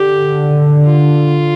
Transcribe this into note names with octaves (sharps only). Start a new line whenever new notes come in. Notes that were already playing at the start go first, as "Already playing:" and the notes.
Already playing: D3 G4
F4